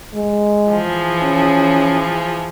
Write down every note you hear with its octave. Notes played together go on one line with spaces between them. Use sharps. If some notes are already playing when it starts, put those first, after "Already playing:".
G#3
E3 F3 G#4
C#4